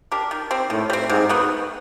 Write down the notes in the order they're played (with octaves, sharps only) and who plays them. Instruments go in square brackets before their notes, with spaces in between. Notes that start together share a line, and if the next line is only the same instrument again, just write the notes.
[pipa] D4 G4 A#4
D#3
G3 C4
[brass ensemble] A2 [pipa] D#3
[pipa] G3 C4
[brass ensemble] G#2 [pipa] C3
[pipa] D#3 F#3 B3